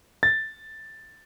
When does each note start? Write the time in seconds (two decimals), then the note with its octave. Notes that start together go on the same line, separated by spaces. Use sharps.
0.23 A6